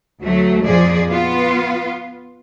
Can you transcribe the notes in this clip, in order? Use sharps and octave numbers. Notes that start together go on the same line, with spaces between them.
D2 F#3 A3
F2 A#2 F3 G#4 D5
B3 F4